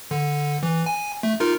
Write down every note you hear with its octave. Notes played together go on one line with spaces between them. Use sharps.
D3
E3
G#5
A3
D#4 F4 A#4